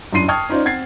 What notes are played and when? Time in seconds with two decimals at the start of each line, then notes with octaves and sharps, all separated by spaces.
0.13 F#2 D4 E4 C6 C7 D#7
0.28 G5 A5 C#6 D#6 F6 G#6
0.49 C#4 D#4 F4 C5 D5
0.65 C4 F#5 G#6 A6 C7